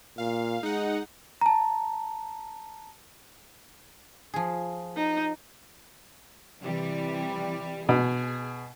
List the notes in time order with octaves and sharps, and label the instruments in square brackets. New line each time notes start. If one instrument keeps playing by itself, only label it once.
[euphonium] A#2 [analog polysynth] F5
[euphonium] G#3 [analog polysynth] D#4 F#5
[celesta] A5 A#5
[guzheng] F3 G#4
[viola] D#4
[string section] C3 E3 G3
[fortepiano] B2 [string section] G#4